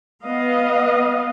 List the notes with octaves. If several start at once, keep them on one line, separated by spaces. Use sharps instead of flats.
B3 D#5 F5